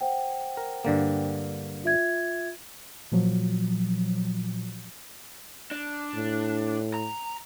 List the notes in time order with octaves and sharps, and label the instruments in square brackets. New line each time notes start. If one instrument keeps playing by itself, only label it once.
[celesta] C5 F#5 G5
[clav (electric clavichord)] A#4
G2 D3 A#3
[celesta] F4 E5 G#6
[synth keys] A#2 F3 F#3
[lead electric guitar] D4
[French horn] A2
[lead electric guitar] A#5